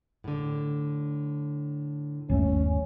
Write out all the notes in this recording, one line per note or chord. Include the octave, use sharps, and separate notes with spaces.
A2 D3
G1 D#2 A3 C#4